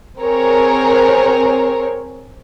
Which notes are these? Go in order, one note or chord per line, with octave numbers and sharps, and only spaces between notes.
C4 G#4 A#4 C#5